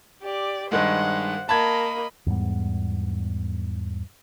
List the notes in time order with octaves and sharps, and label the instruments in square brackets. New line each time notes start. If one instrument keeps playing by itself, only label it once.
[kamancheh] G4 D5
[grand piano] G2 D#3 G#3 [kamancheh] C5 [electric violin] F#5
[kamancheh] A#3 D#5 [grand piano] A5 G#6 [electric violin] B5
[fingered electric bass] E2 G#2 G3 B3